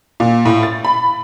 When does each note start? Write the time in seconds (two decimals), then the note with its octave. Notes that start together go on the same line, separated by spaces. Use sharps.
0.20 A#2
0.45 A2
0.63 A6
0.85 B5